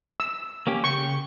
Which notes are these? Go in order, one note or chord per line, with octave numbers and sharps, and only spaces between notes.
E6
A#3 C#4 G4
C#3 G5 C#6